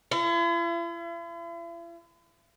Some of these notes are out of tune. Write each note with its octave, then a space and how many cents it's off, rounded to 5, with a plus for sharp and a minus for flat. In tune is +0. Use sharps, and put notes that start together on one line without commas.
E4 +45